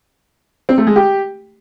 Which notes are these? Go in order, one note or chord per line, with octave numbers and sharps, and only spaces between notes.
C4
A3
G#3
G4